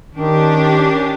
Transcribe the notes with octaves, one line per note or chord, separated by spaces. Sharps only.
D#3 C#4 D4 G4